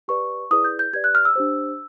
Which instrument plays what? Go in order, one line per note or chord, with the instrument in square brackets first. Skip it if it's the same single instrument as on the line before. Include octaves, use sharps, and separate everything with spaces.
[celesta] G4 B4 D5 C#6
E4 G#4 B4 D5 D#6
G6
G6
G4 B4 D5 G#6
F#6
F6
E6
D4 G4 C5